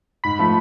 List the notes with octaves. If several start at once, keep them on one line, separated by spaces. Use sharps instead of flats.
G#2 B5
F3 A3